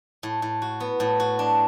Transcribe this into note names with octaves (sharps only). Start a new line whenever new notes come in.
A2
A2
F#4
B3
A2
F#4
D4